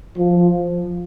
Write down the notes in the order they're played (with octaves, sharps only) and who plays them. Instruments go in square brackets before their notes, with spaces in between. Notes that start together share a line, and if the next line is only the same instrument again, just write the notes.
[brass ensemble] F3